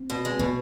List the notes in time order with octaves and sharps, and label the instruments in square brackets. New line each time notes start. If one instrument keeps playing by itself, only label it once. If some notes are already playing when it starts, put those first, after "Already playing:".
Already playing: [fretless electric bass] C4
[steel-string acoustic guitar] B2
G#3
[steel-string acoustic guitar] B2 [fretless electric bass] B3